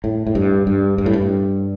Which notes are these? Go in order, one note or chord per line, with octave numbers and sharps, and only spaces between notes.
A2
A2
G2
G2
G2
A2
G2